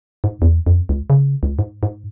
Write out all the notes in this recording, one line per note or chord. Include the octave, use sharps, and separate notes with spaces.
G#2
E2
F2
C#2
C#3
C#2
G#2
G#2